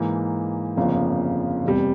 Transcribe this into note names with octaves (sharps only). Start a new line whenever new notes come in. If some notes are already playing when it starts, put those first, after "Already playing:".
Already playing: G#2 E3 A#3
G1 F2 C#3 F3 A#3
F1 E2 C3 G3